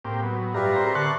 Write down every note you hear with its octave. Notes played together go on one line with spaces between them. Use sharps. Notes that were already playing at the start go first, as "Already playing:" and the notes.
A2 A#3 C4 G4
F#3 B3
G2 F4 G4 B4 D5 E5 A#5
C4 A#4 C5
D3 A5 C#6 F#6